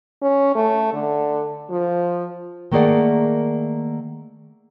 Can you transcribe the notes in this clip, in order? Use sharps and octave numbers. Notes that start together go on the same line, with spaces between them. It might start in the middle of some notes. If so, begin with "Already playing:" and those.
C#4
A3
D3
F3
D#3 A3 A#3 G#4 D5 F#5